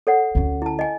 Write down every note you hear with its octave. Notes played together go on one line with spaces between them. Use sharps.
A4 C#5 F#5
D2 C#4
E4 A5
D#5 G#5